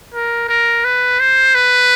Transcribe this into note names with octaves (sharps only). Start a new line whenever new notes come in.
A#4
A#4
B4
C5
B4